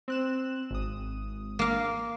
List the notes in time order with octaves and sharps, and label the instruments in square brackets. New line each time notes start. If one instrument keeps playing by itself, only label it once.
[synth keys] C4 F#6 E7
G#1 D#6
[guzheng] A#3 F5